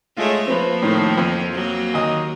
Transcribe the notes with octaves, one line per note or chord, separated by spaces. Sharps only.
G#3 A3 F4 C#5
F3 A#3 C4 B4
A2 D#3 A3
F2
F#3 A#3
D#2 D#5